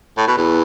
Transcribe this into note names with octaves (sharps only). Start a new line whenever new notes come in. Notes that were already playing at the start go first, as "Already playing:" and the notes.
A2
B2
E2